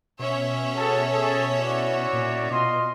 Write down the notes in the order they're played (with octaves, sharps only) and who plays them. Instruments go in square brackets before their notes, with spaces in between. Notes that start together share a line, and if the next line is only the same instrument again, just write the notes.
[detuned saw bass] B2 [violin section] C#4 C#5 E5
[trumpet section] F#4 G#4 A4
G#4 A4
E4 F#4 D5
[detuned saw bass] A#2
[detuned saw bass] B2 [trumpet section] F4 D#5 C6